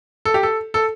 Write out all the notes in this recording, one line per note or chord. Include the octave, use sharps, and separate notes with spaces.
A4
G4
A4
A4